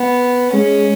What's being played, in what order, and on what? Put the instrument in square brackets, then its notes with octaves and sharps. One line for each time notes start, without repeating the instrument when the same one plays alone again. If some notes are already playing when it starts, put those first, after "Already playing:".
Already playing: [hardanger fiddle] B3
[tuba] G#3 [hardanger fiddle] C#4